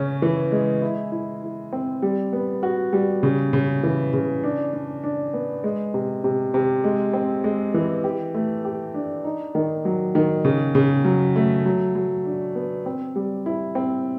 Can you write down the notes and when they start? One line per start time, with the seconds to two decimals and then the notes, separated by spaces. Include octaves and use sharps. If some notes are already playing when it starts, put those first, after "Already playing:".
Already playing: C#3 C#4
0.22 E3
0.52 G#3
0.82 E4
1.12 E4
1.43 E4
1.73 C4
2.02 G3
2.33 B3
2.63 F#4
2.93 G3
3.23 C#3
3.53 C#3
3.83 E3
4.13 C#3
4.44 D4
4.73 D4
5.04 D4
5.34 B3
5.64 G#3
5.94 C3
6.24 C3
6.54 C3
6.84 G#3
7.13 C4
7.44 G#3
7.74 E3
8.04 G4
8.34 A3
8.65 G4
8.94 D4
9.24 D#4
9.55 D#3
9.85 F#3
10.15 D#3
10.45 C#3
10.75 C#3
11.05 F#3
11.36 A3
11.66 F#3
11.95 F#3
12.25 D4
12.55 B3
12.86 C4
13.16 G3
13.46 E4
13.75 C4